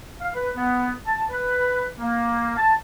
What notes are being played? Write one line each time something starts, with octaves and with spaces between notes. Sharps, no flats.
F5
B4
B3
A5
B4
A#3
A5